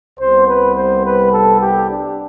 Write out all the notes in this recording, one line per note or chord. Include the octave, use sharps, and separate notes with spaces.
C2 C3 G3 B3 C5
B4
C5
B4
A4
G4
D4